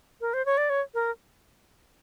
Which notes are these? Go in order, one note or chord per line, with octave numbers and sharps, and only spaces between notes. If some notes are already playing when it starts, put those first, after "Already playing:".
A#4
C5
C#5
D5
C#5
A#4